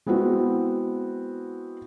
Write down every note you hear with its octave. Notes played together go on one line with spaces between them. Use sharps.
G#3 B3 C4 E4 F#4